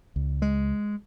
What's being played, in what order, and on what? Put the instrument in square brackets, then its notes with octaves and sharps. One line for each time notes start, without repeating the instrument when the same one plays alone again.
[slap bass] C#2
G#3